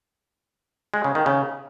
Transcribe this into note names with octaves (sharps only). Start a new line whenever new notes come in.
G#3
C#3
D#3
C#3